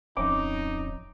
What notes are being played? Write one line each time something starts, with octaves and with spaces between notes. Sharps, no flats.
D1 F2 C#4 D#4 D6